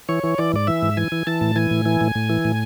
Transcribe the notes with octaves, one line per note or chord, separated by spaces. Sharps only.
E3 C#5
E3
E3 D5
G#2 D5
E3 E5
G#2
E3 G#5
E3
E3 A5
A2
E3 G#5
A2
E3
A2
A2
E3
A2